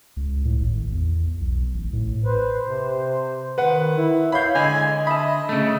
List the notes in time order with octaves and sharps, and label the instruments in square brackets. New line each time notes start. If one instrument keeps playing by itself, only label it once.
[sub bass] C#2
A2
G#1
E2
B1
A1
A2
[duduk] B4 [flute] C5
[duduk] C3
[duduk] D#3 [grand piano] B4 F#5
[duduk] E4
[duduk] C#5 [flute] F5 [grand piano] B5 G6
[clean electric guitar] D3 [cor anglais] G#3 [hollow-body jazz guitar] D#5 [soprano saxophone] G#5
[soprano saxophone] D#5 [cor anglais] E5 [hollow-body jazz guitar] A5 B5
[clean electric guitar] C#3 A3